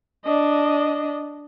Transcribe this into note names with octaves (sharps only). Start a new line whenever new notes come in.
D4 D#5